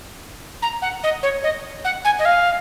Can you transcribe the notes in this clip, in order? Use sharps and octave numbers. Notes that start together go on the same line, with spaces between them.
A#5
F#5
D#5
C#5
D#5
F#5
G#5
D#5
F5